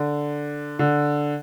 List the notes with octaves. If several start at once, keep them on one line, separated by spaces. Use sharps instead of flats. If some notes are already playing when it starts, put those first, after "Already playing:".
Already playing: D3
D3